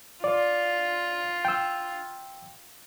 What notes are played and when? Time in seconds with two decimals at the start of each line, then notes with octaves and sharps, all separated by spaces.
0.24 F4 D5
1.45 G5 E6